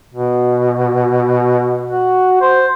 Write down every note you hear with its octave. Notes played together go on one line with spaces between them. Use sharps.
B2
F#4
C5